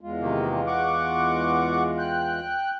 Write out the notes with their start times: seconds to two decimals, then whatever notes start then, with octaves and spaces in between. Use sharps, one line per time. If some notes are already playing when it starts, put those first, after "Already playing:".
0.01 E2 G#3 F4
0.22 C3 D#3 A#3
0.67 F#5 C#6 D6
1.98 G5 F#6